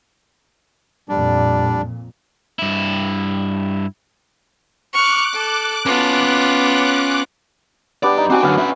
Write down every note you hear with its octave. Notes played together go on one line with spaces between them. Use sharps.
F2 A#2 G3 D4
G2 E4
C#6 D6 F6 F#6
A4
B3 C#4 F4 A5
G2 B3 D4 G4 D5
D#4
C4 D4 F#4 G5 G#5
F#2 D3 B3 F5
C#4 E5